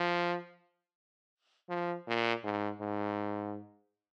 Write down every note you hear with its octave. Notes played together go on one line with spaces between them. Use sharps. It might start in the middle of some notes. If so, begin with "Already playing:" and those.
Already playing: F3
F3
A#2
G#2
G#2